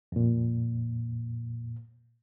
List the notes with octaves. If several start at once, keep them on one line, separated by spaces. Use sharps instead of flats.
F2 A#2